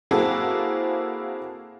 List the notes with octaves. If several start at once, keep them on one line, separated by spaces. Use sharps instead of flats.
A#3 C4 E4 F#4 G#4 A4